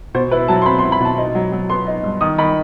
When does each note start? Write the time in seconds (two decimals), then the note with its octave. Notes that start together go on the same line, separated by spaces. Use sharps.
0.15 B2 C5
0.31 E4 B4
0.48 F#3 A5
0.62 C6
0.66 C4 B5
0.79 C6
0.83 E4
0.92 B5
1.00 B2 A5
1.18 D#4
1.35 F#3
1.52 F#3
1.70 B3 C6
1.87 D#4
2.04 G2
2.21 D#3 D#6
2.38 D#3 B5